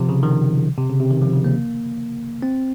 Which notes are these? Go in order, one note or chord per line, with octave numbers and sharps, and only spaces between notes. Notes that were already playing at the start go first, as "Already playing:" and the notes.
Already playing: C3 F3
C#3
D#3
C3
C#3
C3
D#3
F3
C#3
A#3
C4